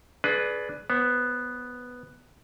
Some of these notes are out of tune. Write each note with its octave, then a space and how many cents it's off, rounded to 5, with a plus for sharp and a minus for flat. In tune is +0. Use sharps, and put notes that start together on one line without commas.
D4 +0 G#4 +30 B4 +0
B3 +0 C5 +30